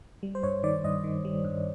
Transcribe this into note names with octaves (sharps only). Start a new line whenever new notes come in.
G3
C5
G2 C#5
D#3 D5
G2 D#5
D#3
G3
G2